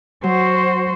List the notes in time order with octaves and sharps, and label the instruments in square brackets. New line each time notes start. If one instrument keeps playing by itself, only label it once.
[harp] F#3 [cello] F#4 C5